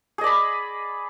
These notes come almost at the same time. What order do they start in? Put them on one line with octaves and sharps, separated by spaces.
G#4 D#5 D5 B5